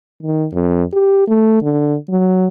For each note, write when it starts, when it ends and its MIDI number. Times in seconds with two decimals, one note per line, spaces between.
0.23 0.47 51
0.53 0.83 41
0.93 1.26 67
1.28 1.62 57
1.62 1.95 50
2.10 2.48 54